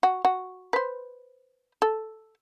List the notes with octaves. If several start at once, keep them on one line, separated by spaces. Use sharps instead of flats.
F#4
F#4
B4 C5
A4